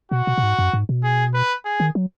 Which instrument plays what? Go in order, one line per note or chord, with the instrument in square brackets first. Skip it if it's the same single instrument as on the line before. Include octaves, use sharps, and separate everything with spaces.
[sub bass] B2 [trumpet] F#4
[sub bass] B2
B2
G#2
F#2
G#2
B2
[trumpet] G#4
B4
G#4
[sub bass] D#3
F#3